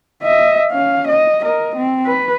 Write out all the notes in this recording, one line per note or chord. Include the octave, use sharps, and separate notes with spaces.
D#5 E5
C#4 F5
D#5
A#4 D#5
C4
B4